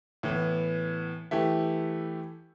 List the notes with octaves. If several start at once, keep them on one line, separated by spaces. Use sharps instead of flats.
A2 E3 B3
E3 A3 E4 G4